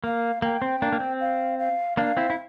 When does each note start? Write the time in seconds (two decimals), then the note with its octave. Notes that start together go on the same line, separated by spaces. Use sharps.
0.04 A#3 F5
0.42 A#3 G5
0.62 C4
0.82 A#3 D4
0.93 A#3
1.00 C4
1.20 F5
1.59 F5
1.97 A#3 D4 F5
2.17 C4 E4
2.30 E4